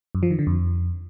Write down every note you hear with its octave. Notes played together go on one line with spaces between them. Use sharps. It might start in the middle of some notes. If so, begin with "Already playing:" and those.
F#2
F3
D#3
D3
F2